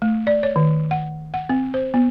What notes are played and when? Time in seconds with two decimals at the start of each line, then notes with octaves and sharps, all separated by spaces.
0.02 A3
0.27 D5
0.43 C#5
0.56 D#3
0.91 F#5
1.34 F#5
1.49 C4
1.74 C5
1.94 B3